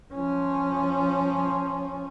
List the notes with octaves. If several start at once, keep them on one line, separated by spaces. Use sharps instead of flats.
F3 C#4